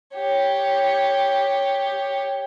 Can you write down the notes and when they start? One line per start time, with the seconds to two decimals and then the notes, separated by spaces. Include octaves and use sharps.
0.15 G4 C#5